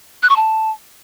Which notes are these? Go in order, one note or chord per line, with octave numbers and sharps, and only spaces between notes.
F#6
C#6
A5